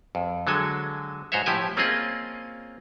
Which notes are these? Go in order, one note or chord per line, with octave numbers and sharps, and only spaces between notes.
F2
D3 F#3 G#3 A4 G#5
G#2 F#4 C5 C#5 E5
A2 F3 E4 G4 G#5
A#3 C4 C#4 F4 G#4 D#5